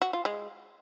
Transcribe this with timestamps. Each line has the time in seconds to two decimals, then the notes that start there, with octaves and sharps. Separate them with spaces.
0.02 F#4
0.13 F4
0.25 G#3